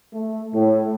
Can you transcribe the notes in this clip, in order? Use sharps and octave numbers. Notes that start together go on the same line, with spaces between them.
A3
A2